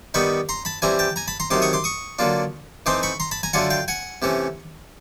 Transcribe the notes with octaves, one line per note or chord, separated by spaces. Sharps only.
D#3 G3 B3 D#4 B5 C#6
A#5 C6
A5 B5
E3 G3 C4 E4 G#5 A#5
G5 A5
G#5 A#5
A5 B5
A#5 C6
C3 D#3 F#3 A3 C6 D6
C#6 D#6
C6 D6
C#6 D#6
D3 F#3 A#3 D4 F4
E3 A3 C4 D#4 C6 D6
B5 C#6
A#5 C6
A5 B5
G#5 A#5
D3 F#3 A3 D4 F4 F#5 G#5
F5 G5
F#5 G#5
C3 E3 A3 C#4